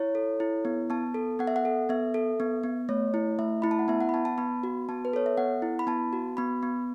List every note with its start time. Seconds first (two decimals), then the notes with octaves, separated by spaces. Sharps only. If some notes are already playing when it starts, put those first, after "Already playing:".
Already playing: E4 C#5
0.15 A4
0.40 E4
0.65 B3
0.90 B3 A5
1.14 A4
1.39 B3 F#5
1.47 E5
1.56 F#5
1.65 A4
1.89 B3 E5
2.14 A4
2.40 B3
2.64 B3
2.89 A3 C#5
3.14 E4
3.39 A3 E5
3.62 E4 B5
3.71 A5
3.79 F#5
3.88 B3 E5
4.01 F#5
4.09 B5
4.14 B3 A5
4.25 A5
4.38 B3 B5
4.63 F#4
4.89 B3 A5
5.05 B4
5.13 A4 C#5
5.26 E5
5.37 B3 F#5
5.62 E4
5.79 B5
5.87 B3 A5
6.13 F#4
6.37 B3 B5
6.63 B3